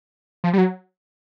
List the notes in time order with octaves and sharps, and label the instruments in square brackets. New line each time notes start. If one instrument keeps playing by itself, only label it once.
[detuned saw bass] F3
G3
F#3